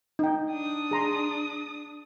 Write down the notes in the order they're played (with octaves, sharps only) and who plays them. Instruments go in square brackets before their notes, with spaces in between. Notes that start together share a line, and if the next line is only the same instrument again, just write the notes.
[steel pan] D#4 G5
[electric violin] D4 D#6
[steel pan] G#4 A#5 C6